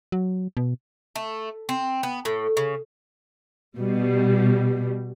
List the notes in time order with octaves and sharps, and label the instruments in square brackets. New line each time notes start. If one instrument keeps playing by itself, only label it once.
[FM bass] F#3
B2
[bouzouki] A3
C4
B3
A2
C#3
[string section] B2 G3